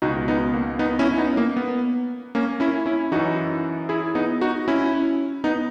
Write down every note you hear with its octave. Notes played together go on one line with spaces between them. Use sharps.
C#2 B2 D#4 F#4
B3 D#4
A#3
B3 D#4
C#4 E4
B3 D#4
A#3
B3
A#3 C#4
C#4 E4
C#4 E4
F#2 E3 D#4 F#4
E4 G#4
B3 D#4
D#4 F#4
C#4 E4
B3 D#4